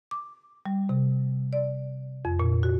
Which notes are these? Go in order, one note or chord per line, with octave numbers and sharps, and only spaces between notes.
D6
G3
C3
D5
F2
A#2
F#4